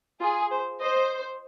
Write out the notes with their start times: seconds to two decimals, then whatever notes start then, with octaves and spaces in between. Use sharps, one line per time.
0.20 F4 G#4
0.51 C5
0.80 C5 D#5